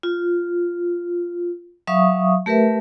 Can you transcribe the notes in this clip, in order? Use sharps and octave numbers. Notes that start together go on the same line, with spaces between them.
F4
F#3 E5 F5 C#6 D#6
A3 G4 A#4 B4 E5